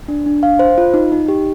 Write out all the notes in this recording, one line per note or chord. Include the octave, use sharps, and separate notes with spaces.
D4
D4
F5
C5
F4
D#4
D#4
G4